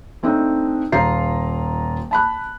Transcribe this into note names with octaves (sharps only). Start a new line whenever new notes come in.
A3 C4 D4 D#4
D#1 F4 A#5 C7
A5 B5 F#6